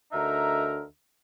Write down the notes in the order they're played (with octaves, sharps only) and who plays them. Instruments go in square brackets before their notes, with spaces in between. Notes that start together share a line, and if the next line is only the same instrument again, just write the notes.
[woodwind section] D2 D3 D#4 A#4 E5